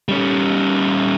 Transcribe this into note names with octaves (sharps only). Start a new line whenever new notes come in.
G3 C#4